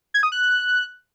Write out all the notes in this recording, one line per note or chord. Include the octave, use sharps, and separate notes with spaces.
G#6
D#6
F#6